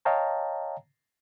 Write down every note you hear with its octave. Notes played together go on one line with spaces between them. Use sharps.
C#5 D#5 F5 G5 A5 A#5